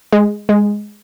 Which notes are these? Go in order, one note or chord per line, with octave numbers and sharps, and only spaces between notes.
G#3
G#3